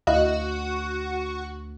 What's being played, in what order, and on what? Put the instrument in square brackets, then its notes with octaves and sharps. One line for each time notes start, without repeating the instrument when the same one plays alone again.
[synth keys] D2 [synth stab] E4 D#5 F5 [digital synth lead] F#4